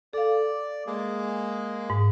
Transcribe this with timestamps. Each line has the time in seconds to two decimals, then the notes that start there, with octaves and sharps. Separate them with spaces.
0.13 A4 D5 F5
0.87 G#3 A#3 G#4
1.90 G#2